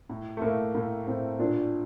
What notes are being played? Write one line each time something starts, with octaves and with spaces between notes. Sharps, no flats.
A2
A3
A2 A#3
A2 A#3
A2 C4
A#2 D4